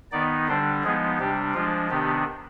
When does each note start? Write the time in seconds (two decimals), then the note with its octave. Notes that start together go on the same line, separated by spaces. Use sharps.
0.12 D#3 B3 D#4 D5
0.48 D3 G3 D4 C5
0.84 F3 G#3 B3 D#4 G#4
1.19 C3 G3 D4 G4
1.54 F3 G#3 D4 F4
1.90 C3 D#3 B3 D4 G4